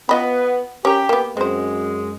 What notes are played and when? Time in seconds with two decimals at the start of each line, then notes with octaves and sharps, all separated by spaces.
0.09 B3 F4 D#5 B5
0.85 C#4 G4 A#4
1.09 A#3 B3
1.37 F#2 G#3 C4 C5